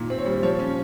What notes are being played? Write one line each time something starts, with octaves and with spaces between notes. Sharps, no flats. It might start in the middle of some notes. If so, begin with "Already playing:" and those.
Already playing: A#2 D#3
C4
C#5
G3
F3 C#5
C#4